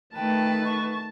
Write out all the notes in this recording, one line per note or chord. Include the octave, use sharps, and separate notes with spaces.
D#3 A3 B4 G5 A5
C#6